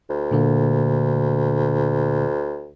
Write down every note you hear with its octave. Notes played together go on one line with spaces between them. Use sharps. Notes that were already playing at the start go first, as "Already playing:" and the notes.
D2
A#2 D3 A#3